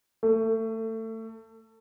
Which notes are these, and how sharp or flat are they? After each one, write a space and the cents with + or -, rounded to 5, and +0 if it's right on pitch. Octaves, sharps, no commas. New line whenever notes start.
A3 +25